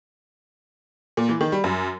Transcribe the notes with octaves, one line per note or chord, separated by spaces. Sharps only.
A#2
E3
D#3
G3
F#2